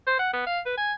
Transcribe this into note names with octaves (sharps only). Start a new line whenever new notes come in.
C5
F#5
B3
F5
B4
G#5